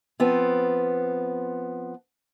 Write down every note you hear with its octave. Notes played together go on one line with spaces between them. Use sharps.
F3 B3 C4